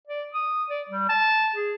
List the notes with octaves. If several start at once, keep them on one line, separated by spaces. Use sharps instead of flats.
D5
D#6
D5
G3
A5
G#4